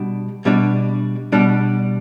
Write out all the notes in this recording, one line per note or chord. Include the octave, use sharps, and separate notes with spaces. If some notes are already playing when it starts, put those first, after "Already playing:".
Already playing: B2 G3 D4
B2 G3 D4
B2 G3 D4